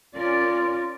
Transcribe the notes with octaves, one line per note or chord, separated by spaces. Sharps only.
C#4 F4 A#4 D5